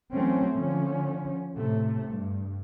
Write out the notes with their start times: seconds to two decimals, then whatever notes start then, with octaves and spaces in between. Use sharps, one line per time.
0.13 E3 F#3 A3 C4 C#4
0.55 D3 F3 C#4
1.57 A2 C3 A3
2.09 G2